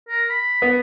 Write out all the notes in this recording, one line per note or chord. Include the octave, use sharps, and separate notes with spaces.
A#4
B5
B3